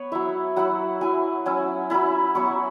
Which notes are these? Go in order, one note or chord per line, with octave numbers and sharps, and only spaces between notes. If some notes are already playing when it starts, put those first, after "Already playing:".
Already playing: B3 B4 C#5
F#3 E4 E5
F#3 E4 F#5
F#3 E4 G#5
F#3 C#4 E4
F#3 C#4 E4 B5
F#3 B3 E4 C#6